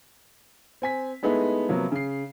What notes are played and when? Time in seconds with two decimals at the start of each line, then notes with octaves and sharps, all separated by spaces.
0.82 C4 G#5 B6
1.23 G#3 A3 B3 D#4 E4 G#4
1.68 C3 F3 F#3 A#3 B3
1.92 C#3 C7